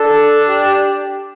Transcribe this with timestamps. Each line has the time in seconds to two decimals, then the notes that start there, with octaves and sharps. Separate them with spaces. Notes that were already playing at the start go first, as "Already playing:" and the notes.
Already playing: D4 A4
0.49 G4